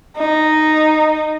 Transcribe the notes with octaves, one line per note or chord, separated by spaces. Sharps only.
D#4